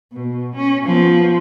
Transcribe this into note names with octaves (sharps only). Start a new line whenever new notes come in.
B2
C#4
F3 B3